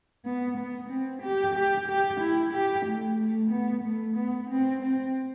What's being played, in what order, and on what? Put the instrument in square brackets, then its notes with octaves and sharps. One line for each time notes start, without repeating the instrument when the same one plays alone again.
[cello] B3
B3
C4
G4
G4
G4
E4
G4
A3
A3
B3
A3
B3
C4
C4